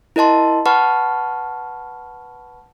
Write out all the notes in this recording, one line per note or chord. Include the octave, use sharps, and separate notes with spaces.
E4 A#4 D#5 A5 C6
B4 F#5 A5 B5 C#6 F6